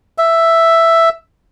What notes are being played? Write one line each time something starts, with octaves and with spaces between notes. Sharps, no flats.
E5